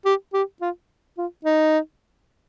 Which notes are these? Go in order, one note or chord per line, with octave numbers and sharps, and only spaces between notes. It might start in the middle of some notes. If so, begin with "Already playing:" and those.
G4
G4
F4
F4
D#4